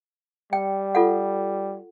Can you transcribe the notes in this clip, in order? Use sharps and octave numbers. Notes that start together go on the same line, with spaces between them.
G3 G5
F4 A4 F#5